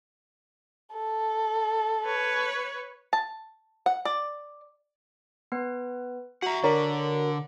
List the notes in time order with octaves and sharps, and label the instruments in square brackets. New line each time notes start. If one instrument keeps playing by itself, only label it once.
[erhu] A4
[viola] B4 C#5
[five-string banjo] A5
F#5
D5
[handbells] B3 B4
[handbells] F#4 A#5 [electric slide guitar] E5 F#5
[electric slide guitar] D3 [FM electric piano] F#4 A#4 C#5 [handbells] D5 B6